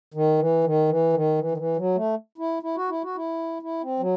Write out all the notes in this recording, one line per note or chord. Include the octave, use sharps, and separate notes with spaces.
D#3
E3
D#3
E3
D#3
E3
D#3
E3
F#3
A3
E4
E4
F#4
E4
F#4
E4
E4
C4
F#3